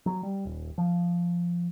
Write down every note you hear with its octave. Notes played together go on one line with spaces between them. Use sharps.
F#3
G3
D#1
F3